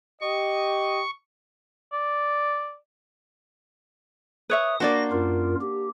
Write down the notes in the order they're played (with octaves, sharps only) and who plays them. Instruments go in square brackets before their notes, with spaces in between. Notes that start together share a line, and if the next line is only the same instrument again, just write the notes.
[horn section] G4 D#5 [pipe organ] C#6
[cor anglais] D5
[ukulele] B4 C#5 E5 [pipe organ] D#6
[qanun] A#3 D4 C5 [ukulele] F#4 D5 [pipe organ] A#6
[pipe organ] F#2 F4 A#4
G4